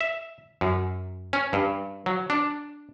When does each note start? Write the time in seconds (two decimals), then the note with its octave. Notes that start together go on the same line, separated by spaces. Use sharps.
0.01 E5
0.61 F#2
1.33 C#4
1.53 G2
2.06 F#3
2.30 D4